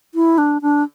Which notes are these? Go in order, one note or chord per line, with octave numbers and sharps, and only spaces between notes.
E4
D4
D4